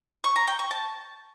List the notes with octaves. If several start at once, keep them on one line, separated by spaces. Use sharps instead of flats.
C#6
A#5
G5
C#6
A5